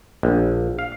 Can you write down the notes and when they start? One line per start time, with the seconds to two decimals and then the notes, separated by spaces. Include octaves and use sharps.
0.23 A#1
0.79 F5